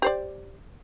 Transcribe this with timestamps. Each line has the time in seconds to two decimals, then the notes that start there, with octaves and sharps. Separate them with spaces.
0.02 G4 C5 D5